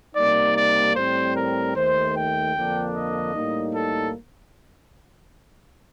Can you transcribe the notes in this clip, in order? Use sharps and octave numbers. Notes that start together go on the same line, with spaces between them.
C3 G3 A#3 D#4 D5
D5
A2 G3 C4 C5
A#4
D#2 D#3 A3 C5
G5
F2 D3 F3 A#3 D4
D#5
A2 G3 A#3 D#4
A4